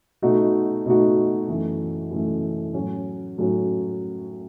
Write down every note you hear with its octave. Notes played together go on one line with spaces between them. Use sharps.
B2 A3 D#4 F#4
B2 A3 D#4 F#4
F#2 E3 A3
F#2 E3 A3
A2 F#3 C#4 F#4
A2 F#3 C#4 F#4